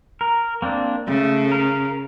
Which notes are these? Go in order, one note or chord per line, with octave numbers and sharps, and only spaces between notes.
A#4
A#3 C4 D4
C#3 A3
A#4